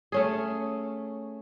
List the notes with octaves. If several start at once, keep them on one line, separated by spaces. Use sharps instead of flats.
A3 C#4 G#4